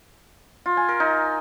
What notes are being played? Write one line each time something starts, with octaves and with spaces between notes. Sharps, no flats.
F4
G#5
A#4
D#4